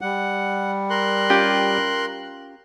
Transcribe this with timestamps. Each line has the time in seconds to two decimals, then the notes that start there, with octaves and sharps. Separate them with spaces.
0.01 G3 F#5
0.90 A#4 C6 F#6
1.30 C#4 F4 G4